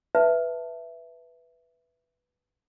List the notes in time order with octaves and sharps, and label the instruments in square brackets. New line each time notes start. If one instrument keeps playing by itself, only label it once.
[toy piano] B4 E5 A5